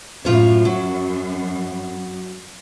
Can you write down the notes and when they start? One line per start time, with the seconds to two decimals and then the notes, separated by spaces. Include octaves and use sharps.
0.25 F#2 A2 F4 C#5
0.65 F#3